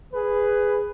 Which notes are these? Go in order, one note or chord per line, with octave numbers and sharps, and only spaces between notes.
G#4 B4